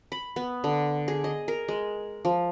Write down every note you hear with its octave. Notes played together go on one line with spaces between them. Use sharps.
B5
B3
D3
G#4
D#5
A#4
G#3
F3